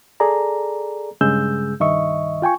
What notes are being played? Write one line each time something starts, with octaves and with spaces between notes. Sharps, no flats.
G#4 A4 D5 A#5
G2 C#3 G#3 G#4 E6 G6
C2 G2 D#3 D#5 E5 C#6
F4 G5 G#5 C#6